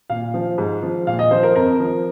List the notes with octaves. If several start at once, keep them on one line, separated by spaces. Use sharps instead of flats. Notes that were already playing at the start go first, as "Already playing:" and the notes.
A#2 F5
F3
G#2
F3
A#2 F5
D#5
F3 C5
A#4
F2 A#4
F3